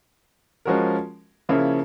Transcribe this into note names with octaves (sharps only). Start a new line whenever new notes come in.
F3 G#3 C#4 F#4 A#4
C#3 F3 A#3 C#4 E4